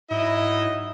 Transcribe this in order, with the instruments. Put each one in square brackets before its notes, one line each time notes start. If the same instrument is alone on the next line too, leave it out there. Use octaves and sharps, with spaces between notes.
[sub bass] G#2 [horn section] F#3 D#4 D#5 [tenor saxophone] E4